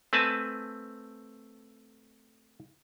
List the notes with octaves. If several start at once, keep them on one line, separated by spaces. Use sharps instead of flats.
A3 C4 B4 G#5 A5